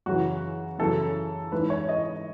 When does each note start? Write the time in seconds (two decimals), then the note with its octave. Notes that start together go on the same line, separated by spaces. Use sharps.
0.06 F#2 C#3 E3 F#4
0.79 F#2 C#3 E3 A4
1.52 G#2 E3 B4
1.70 C#5
1.89 D#5